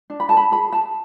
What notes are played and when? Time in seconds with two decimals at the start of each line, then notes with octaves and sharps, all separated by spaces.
0.10 D4
0.20 B5
0.29 A4 A5
0.37 B5
0.52 G#4 B5
0.72 G#4 A5